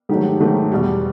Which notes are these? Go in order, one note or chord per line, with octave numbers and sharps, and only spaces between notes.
G#2 D#3 F#3 A3 G4
G#2 D#3 F#3 A3
E2 B2 G3